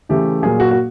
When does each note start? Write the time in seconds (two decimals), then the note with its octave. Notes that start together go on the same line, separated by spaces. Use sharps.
0.09 C#3 E3 A3 G4
0.43 A#2 F#3 A#3 G#4
0.60 F#4
0.71 F#4